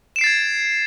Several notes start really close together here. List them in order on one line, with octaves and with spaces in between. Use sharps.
E7 D7 C7 A6 G#6